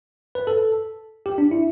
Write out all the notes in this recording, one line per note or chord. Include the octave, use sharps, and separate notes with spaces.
B4
A4
G4
D4
E4